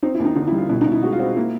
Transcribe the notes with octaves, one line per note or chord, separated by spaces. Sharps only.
C4 D#4
E4
D#2
D#4
D3 D#4
E4
G3
F4
B2 E4
D#4
B2 E4
G#3 F#4
F4
C4 F#4
A#3 E4